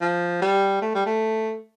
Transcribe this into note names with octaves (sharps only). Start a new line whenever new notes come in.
F3
G3
A3
G3
A3